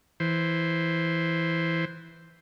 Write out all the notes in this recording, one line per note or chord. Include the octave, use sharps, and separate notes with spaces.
E3 C5